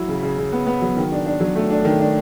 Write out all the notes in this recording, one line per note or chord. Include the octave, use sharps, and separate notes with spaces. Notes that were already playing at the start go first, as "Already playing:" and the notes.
Already playing: F#3 E4
C#3
C#3
C#3
B3
B3
F#3
D#3
D4
D4
F#3
A3
D4
D#3
D4